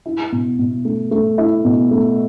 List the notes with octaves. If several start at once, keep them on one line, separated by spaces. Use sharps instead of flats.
E4
B2
B2
A3
A3
E4
B2
A3